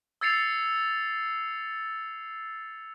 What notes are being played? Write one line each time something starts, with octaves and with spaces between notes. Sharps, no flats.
E6 G#6 A6 C7 C#7 F7